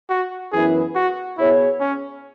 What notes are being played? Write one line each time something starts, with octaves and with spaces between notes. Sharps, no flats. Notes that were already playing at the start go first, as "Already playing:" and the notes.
F#4
F#2 E3 B3 E4 G#4 B4
F#4
B2 B3 E4 G#4 C#5
C#4